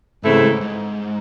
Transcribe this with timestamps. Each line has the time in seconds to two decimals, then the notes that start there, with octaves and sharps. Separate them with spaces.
0.23 G#2 C#3 E3 A3 C4 E4
0.42 G#2
0.61 G#2